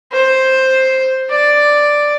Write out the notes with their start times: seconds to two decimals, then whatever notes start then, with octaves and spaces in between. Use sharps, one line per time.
0.12 C5
1.30 D5